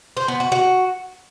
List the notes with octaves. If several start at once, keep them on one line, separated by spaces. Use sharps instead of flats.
C5
B3
F#4
F#4